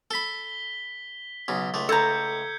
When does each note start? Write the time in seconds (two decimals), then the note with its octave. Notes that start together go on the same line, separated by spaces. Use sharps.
0.11 A4 B5 B6 G7
1.48 B1 C#3
1.74 C#2 A3
1.89 A4 A#5 G6 G#6 C#7